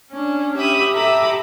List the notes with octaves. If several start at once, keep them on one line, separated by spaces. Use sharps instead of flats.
C#4 D4
G4 E5 B5 D#6
G4 A4 E5 A#5 B5 D6